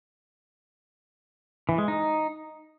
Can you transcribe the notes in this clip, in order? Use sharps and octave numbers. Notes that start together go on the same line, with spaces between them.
E3
G#3
D#4